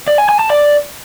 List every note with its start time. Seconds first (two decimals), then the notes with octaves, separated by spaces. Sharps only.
0.07 D5
0.18 G#5
0.29 G#5
0.39 A5
0.50 D5